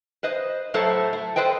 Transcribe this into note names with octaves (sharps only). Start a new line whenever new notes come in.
B4 C5 D#5
A2 F#3 A3 A4 C5
A3
A4 B4 C5 D#5 G5